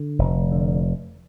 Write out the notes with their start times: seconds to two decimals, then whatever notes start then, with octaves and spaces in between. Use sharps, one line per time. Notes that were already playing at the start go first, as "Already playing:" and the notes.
Already playing: D3
0.19 F1
0.52 D3